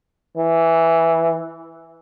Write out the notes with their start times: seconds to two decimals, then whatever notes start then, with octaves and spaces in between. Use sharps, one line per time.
0.37 E3